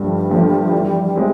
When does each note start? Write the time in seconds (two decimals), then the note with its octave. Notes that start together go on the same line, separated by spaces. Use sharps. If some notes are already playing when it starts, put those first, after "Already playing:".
Already playing: G2 D3 F3 G3 A3
0.29 D3 F3 A3
0.73 E3
1.16 G#3 C4 E4 G4